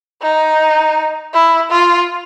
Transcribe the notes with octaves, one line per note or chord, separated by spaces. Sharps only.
D#4
E4
F4